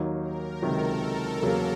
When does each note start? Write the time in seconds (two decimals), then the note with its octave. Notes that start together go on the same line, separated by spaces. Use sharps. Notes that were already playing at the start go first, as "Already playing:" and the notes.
Already playing: D#2 D#3 F#3 A#3 D#4
0.21 A#4
0.62 C#2 C3 D#3 F#3 A4
1.02 A#4
1.42 E2 C#3 F#3 A#3